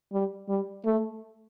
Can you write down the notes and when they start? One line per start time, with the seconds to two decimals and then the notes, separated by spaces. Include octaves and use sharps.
0.13 G3
0.49 G3
0.85 A3